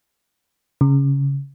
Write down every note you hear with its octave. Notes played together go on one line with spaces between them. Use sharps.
C#3